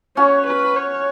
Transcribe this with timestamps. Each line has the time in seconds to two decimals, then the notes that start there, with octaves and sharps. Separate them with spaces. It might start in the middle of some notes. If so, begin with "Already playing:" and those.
0.16 C#4 F#4 C#5
0.47 B4
0.76 C#5